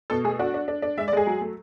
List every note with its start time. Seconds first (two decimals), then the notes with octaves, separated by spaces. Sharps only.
0.10 B2 A4
0.24 A3 G#4
0.39 D4 F#4
0.54 D4
0.68 D4
0.82 D4
0.97 G#3 E5
1.08 D5
1.13 G#3 G#4
1.27 F#3
1.41 A3